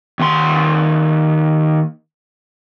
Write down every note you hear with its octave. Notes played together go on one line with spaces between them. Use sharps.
D#2 C6